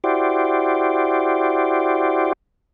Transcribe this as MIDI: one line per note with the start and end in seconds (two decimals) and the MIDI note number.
0.04 2.33 64
0.04 2.33 66
0.04 2.33 67
0.04 2.33 72
0.04 2.33 74